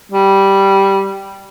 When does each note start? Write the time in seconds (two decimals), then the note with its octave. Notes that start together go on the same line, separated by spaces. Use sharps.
0.12 G3